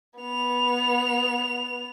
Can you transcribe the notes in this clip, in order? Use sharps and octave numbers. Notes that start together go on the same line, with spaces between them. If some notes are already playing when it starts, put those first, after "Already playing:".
B3 F7